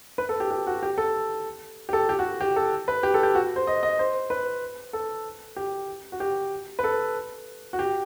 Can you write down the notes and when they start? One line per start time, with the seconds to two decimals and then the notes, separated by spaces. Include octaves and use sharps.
0.18 B4
0.29 A4
0.40 G4
0.51 G4
0.67 F#4
0.83 G4
0.98 A4
1.89 G4
1.93 A4
2.09 G4
2.19 F#4
2.41 G4
2.56 A4
2.88 B4
3.03 G4
3.14 A4
3.23 G4
3.35 F#4
3.56 C5
3.67 D#5
3.83 D#5
3.99 C5
4.30 B4
4.93 A4
5.56 G4
6.12 F#4
6.20 G4
6.79 B4
6.84 A4
7.73 F#4
7.79 G4